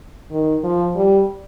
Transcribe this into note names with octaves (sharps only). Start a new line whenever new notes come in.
D#3
F3
G3